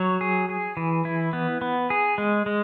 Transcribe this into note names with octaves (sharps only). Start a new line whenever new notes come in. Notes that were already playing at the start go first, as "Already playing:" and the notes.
Already playing: F#3 C#5
G#4
G#4
E3
E4
B3
B3
G#4
G#3
G#3